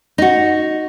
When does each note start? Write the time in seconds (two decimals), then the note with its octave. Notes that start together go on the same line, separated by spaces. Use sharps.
0.18 D#4 F#4